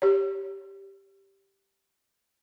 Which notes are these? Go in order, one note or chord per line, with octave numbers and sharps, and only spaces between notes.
G4 C#5